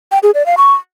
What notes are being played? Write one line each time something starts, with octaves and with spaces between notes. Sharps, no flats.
G5
G#4
D5
F5
C#6